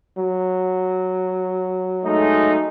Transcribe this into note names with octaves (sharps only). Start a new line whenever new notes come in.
F#3
G#3 A3 D#4